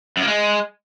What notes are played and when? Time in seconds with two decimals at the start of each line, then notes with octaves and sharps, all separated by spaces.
0.17 F#2
0.22 A#3
0.27 G#3